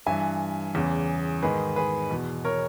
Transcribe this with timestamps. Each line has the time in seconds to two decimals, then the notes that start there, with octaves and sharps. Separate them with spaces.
0.06 G2 E3 E5 G#5
0.75 E2 C#3 E3
1.42 G#2 D#3 G#4 B4
1.76 G#4 B4
2.11 E2 B2
2.45 A#4 C#5